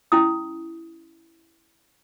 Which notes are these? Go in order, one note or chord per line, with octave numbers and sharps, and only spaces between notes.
C#4 E4 D#6